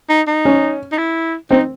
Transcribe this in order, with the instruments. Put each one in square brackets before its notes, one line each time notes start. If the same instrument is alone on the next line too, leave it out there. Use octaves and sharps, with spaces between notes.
[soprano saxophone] D#4
D#4
[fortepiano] C#4
[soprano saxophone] D#4
E4
[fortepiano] C4 [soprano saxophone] D#4